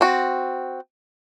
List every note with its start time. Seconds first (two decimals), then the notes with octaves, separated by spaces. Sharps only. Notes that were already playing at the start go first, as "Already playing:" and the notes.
0.01 C4 F#4